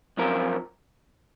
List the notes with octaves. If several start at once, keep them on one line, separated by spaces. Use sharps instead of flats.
F#2 F3 C4 F4 A#4